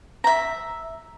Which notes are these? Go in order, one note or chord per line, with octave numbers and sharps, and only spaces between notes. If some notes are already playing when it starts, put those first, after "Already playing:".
E5 A#5